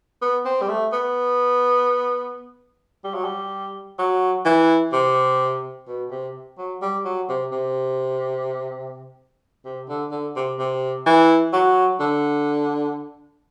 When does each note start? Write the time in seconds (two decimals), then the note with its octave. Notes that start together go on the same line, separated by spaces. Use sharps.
0.22 B3
0.45 C4
0.61 G3
0.69 A3
0.92 B3
3.04 G3
3.15 F#3
3.25 G3
3.99 F#3
4.45 E3
4.93 C3
5.88 B2
6.11 C3
6.58 F#3
6.82 G3
7.05 F#3
7.29 C3
7.52 C3
9.65 C3
9.89 D3
10.11 D3
10.36 C3
10.59 C3
11.06 E3
11.53 F#3
12.00 D3